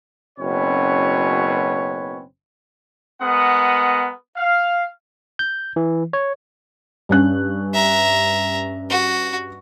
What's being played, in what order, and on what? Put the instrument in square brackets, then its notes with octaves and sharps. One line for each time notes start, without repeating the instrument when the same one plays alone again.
[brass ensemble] F#1 B2 C4 C#4 B4 C#5
[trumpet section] G#3 B3 A#4 F#5 D#6
F5
[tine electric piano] G6
E3
C#5
[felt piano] G2 C#4 F#6
[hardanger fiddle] E5 A#5
F#4